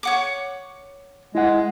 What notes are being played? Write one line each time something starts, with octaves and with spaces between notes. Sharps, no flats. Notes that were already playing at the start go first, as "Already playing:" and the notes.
C#5 F#5 D6
G#3 E4 F#5